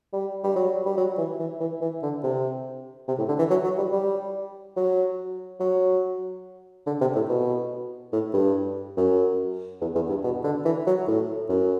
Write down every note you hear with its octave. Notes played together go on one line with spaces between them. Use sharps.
G3
G3
F#3
G3
F#3
E3
E3
E3
E3
D3
C3
C3
A2
D3
E3
F#3
F#3
G3
G3
F#3
F#3
D3
C3
A2
B2
A2
G2
F#2
E2
E2
G2
B2
D3
E3
F#3
A2
F#2